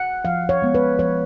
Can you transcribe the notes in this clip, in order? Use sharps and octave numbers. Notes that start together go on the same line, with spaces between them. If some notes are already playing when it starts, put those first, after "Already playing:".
Already playing: F#5
F3 F5
C#5
G#3 B3
B4
F3 C#5